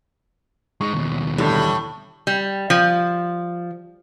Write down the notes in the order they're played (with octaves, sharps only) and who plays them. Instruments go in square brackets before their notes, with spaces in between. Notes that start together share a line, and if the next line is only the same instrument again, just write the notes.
[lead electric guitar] G#3 D#4 [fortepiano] C#6
[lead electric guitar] D#2 B2
[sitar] A2 [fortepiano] D3 G3
[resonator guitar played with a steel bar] G3
F3